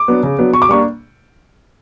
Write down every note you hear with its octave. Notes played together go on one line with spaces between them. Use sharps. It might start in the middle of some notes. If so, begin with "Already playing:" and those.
Already playing: D6
F#3 B3 D4
C#3
F#3 B3 D4
B2 C#6
D6
G3 A#3 D4 C#6